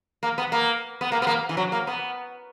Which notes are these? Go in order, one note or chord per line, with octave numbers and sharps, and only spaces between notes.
A#3
B3
A#3
B3
A#3
B3
A#3
E3
F#3
A#3
B3